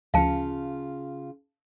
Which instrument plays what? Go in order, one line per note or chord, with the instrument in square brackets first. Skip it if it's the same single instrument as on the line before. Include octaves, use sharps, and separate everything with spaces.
[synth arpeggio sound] D2 F3 C#7 [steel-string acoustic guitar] C#3 F4 [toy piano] F5 A5